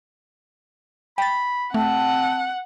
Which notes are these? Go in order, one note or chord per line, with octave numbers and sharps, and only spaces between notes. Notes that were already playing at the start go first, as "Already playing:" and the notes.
G5 B5 A6
A3 C4 F#5 A5